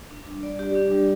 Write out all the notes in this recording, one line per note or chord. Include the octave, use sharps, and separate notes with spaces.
D4
G3
D5
G4
D4
G3